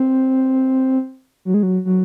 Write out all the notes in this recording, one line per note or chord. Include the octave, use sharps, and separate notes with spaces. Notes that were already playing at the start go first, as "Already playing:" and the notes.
Already playing: C4
F#3
G#3
F#3
F#3